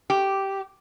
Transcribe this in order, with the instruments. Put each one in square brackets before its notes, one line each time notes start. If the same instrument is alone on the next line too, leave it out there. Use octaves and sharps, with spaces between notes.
[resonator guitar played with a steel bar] G4